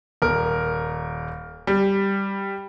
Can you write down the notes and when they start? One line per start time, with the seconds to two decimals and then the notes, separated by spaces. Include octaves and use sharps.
0.22 D#1 A#4
1.67 G3